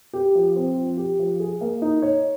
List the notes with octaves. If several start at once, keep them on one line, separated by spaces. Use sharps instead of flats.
G4
F3
C4
F3
G4
F3
G#4
A#3
D#4
C#5